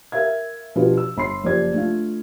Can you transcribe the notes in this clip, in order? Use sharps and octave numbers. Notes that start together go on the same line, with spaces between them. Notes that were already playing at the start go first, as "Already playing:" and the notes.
A#4 E5 F5 G#6
B2 F3 D4 F4 G4 B4
E6
G1 B5 C6 C7
F#1 F3 G4 C5 D5 G#6
A3 D4 F4